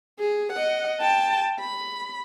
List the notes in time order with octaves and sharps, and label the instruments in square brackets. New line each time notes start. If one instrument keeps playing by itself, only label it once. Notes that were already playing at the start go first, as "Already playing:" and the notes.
[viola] G#4
D#5 F#5
G5 A5
B5